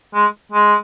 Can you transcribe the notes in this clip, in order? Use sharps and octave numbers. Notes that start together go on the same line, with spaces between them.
G#3
G#3